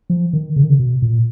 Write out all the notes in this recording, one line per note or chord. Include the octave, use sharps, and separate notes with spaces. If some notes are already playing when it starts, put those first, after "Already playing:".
F3
D#3
C#3
D#3
C#3
B2
A#2